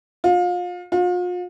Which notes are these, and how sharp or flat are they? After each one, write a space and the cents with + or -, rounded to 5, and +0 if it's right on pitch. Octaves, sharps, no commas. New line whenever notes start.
F4 +30
F4 +40